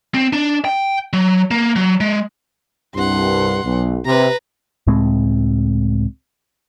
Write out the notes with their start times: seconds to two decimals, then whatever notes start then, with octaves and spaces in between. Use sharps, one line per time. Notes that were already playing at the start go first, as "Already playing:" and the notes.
0.14 C4
0.33 D4
0.65 G5
1.13 F#3
1.51 A#3
1.76 F#3
2.00 G#3
2.94 C2 G2 F#5 C6
3.65 B1
4.05 C3 B4 A#5
4.87 C#2 A2 G#3 C4